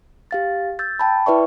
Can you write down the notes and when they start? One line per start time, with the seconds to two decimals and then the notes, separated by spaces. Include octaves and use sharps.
0.31 G4 F5 A6
0.79 E6 G6 A6
0.99 G5 A5 B5
1.26 E4 B4 D5 E5 C#6